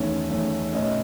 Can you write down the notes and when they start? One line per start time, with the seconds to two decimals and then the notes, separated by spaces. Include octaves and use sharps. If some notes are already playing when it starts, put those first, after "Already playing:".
Already playing: E2 D#3 A3 C#4
0.29 E2 D#3 A3 C#4
0.73 B2 A3 C#4 D#5